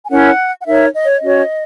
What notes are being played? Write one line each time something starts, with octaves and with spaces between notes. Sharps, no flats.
G#5
C#4 E4 A#4 C#5 F#5
F#5
D#4 A#4 C#5 E5
D#5
C#5
D#5
C#4 F#4 C#5